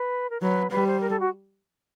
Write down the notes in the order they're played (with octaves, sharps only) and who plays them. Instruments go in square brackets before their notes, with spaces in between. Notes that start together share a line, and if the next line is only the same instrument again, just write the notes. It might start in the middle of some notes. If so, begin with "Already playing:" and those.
Already playing: [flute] B4
A#4
[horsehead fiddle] F#3 [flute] B4
[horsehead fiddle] G3 [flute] B4
[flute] C5
A#4
A4
F#4